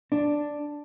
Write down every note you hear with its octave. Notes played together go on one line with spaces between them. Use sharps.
D4